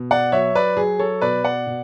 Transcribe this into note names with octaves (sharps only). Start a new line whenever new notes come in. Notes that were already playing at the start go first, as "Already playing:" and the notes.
Already playing: B2
D5 F#5
F#3 C#5 E5
B4 D5
F#3 G#4
A4 C#5
B2 B4 D5
D5 F#5
B2